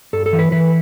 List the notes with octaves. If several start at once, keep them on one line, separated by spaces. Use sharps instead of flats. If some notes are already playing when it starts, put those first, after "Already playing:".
G2 A4
A4
E3
B4
E3 B4